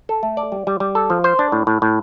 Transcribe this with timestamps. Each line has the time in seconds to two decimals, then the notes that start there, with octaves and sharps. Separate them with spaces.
0.09 A4
0.23 A3
0.37 D5
0.52 G3
0.67 G3
0.80 G3
0.95 A4
1.10 F3
1.24 C5
1.39 D4
1.52 A2
1.67 A2
1.82 A2